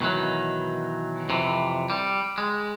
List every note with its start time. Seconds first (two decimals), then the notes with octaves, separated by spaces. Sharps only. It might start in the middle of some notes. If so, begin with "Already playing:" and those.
0.01 B2 D#3 E3 F#3
1.29 F2 C3 E3
1.90 G3
2.38 G#3